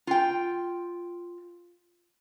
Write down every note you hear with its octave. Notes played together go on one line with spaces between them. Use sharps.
F4 G5